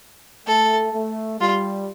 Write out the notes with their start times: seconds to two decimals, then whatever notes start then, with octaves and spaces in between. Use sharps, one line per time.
0.46 A3 A4
0.93 A3
1.40 G3 F4